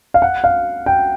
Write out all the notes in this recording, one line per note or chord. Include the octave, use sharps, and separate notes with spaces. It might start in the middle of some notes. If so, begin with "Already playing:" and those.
F5
F#5
F5
G5